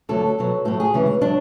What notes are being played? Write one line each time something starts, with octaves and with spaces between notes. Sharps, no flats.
D2 D3 F#3 A4
E2 B2 F#3
A2 F#3 A4
G#4
D2 C#3 E3 G#3
F#3 D4